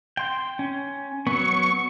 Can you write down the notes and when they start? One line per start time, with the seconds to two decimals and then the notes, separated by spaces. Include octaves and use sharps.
0.17 G5 C6
0.59 C#4
1.27 F#3 B3 C#6